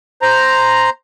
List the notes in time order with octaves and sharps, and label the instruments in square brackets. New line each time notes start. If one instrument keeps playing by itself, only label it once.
[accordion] C5 A#5